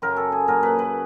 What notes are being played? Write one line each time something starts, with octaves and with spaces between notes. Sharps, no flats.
F#2 C#3 F#3 A#4
A4
G#4
A#2 F#3 A#4
B4
B4